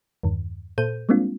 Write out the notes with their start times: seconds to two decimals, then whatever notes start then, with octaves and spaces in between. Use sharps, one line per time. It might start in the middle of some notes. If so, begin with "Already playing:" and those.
0.23 E2 G2 D#3
0.78 A#2 A4 C5 G6 D#7
1.09 G3 G#3 A#3 C4 D4 F4